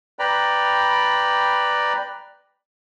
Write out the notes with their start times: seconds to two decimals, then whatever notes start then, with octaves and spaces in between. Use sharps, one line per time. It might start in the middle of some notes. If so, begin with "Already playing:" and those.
0.19 B4 D5 G5 A#5 B5